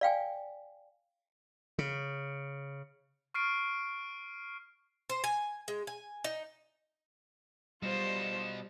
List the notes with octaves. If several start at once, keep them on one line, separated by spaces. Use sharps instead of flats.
D5 F5 G5 G#5
C#3
C#6 F6 C7 D7
C5
G#5
G#3
G#5
D#4
B2 G3 D#4 F4 C5 E7